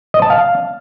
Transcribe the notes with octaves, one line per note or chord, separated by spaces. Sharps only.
D#5
A5
F5